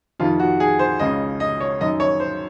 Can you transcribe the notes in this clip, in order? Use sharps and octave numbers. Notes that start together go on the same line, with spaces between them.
F2 C3 D#3 F4
F#4
G#4
C5
C#2 C#3 D#5
D#5
C#5
F#2 D#3 D#5
C#5
C5